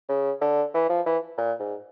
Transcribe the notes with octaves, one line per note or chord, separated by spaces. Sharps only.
C#3
D3
E3
F3
E3
A#2
G#2